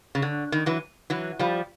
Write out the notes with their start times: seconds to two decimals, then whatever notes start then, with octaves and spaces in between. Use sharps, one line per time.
0.15 C#3
0.22 D3
0.52 D#3
0.66 E3 F#3
1.10 E3 F#3
1.39 F3 G3